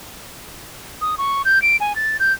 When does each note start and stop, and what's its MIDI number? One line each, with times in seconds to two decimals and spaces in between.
1.01 1.15 87
1.18 1.42 85
1.45 1.61 91
1.62 1.77 98
1.80 1.95 80
1.96 2.17 93
2.20 2.33 91